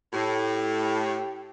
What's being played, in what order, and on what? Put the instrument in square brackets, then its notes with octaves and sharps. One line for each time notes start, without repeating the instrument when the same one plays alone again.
[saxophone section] A2 [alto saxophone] G4